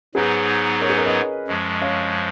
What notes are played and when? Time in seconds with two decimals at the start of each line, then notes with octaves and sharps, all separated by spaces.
0.15 G#2 F#3 B3 D#4 G#4 B4
0.81 A#4 C#5
0.89 G#4 B4
0.97 A#4 C#5
1.06 B4 D#5
1.47 F#2 F3 G#3
1.82 C#5 F5